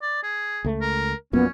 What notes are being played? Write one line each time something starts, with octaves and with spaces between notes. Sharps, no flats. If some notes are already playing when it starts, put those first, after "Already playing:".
D5
G#4
C#2 A3
A#4
A#1 F#2 A#2 B3 C#4